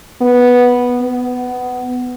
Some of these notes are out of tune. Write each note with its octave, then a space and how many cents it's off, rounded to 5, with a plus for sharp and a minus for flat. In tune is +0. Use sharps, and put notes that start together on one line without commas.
B3 -5
B3 +15